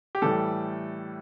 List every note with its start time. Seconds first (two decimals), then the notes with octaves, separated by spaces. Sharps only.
0.15 G4
0.22 A2 E3 G3 A4